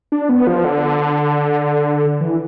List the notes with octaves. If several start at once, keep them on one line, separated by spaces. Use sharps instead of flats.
D4
B3
F3
D3
E3